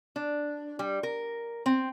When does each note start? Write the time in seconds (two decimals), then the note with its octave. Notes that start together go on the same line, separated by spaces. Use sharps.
0.16 D4
0.79 G3
1.03 A#4
1.66 C4